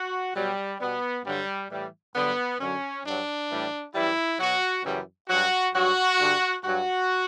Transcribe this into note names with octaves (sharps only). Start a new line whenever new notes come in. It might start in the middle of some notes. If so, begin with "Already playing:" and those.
Already playing: F#4
B2 F#3 G3
B2 G3 B3
G2 D3 F#3 G3
A2 E3 G3
G2 D3 F#3 B3
F#2 D3 F#3 C#4
G2 F#3 D4
A2 E3 G3
F#2 E3 G3 E4
B2 F#3 F#4
F#2 C#3 E3 G3
G2 F#3 F#4
G2 F#3 F#4
G2 D3 G3
G2 F#3 F#4